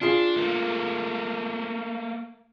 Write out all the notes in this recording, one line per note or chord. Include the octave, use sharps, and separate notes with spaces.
D4 F4 G#4 C7
A3 A#3